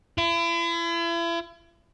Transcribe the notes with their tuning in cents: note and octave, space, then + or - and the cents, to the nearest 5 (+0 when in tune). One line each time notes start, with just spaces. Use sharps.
E4 +40